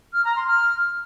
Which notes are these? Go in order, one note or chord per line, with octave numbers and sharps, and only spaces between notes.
F6
A#5
C6
F6